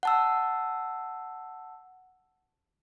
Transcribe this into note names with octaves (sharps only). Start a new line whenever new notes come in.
F#5 A5 E6